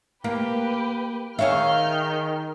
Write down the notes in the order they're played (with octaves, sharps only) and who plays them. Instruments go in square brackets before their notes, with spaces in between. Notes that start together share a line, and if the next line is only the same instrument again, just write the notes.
[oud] A#3 [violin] G4 B4
[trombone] D#3 [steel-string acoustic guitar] G#4 F5 [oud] C#5 E5 [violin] F6 G6